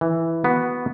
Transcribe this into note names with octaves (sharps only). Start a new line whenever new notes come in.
E3
B3 F#4